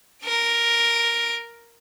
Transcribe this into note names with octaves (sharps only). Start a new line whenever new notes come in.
A#4 D7